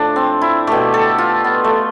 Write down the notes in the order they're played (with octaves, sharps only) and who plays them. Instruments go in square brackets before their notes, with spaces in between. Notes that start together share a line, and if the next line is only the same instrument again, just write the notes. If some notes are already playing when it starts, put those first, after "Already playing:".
Already playing: [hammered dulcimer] A2 F3 A3 D4
C4
E4
B2 A3 G4
A4
F4
B3
A3